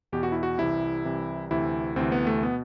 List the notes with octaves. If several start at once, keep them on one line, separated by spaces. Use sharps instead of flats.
E2 B2 G4
F#4
E4
F#4
C2 C3 E3 E4
C2 C3 E3
D2 C3 E3 E4
D2 C3 E3 C4
B3
A3
B2 B3